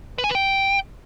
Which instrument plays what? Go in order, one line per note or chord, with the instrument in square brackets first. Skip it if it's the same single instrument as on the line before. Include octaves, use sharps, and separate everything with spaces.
[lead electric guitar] B4
G#5
B4
G5